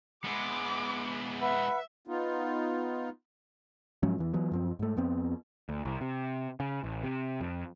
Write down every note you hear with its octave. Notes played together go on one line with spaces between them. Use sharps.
G#3 B3 E4 D6
B4 E5 F#5 B5
B3 D#4 F4
G#2 F3 F#3 C#4
E2 E3
E3 F#3 B3
F#2 F3 C4
G#2 A3
F2 B3 C4
D2
C2
C3
C#3
A1
C3
F2